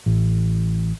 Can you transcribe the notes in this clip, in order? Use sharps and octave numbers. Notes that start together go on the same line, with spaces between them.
A1